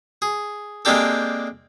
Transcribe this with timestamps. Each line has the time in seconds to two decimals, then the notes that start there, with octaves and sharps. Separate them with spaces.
0.22 G#4
0.85 G#3 A#3 C4 D4 G4 A4